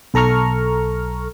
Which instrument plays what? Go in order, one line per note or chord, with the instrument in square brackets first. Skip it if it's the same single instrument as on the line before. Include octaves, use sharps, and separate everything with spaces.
[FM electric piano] B1 A4 A#5 C#6 F6